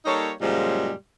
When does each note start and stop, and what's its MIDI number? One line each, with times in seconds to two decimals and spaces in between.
0.06 0.31 55
0.06 0.31 58
0.06 0.31 63
0.06 0.31 69
0.06 0.31 73
0.42 0.91 42
0.42 0.91 46
0.42 0.91 49
0.42 0.91 53
0.42 0.91 55
0.42 0.91 56